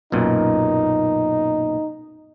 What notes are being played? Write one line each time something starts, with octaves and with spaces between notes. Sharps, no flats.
B1 F#2 A#2 D#4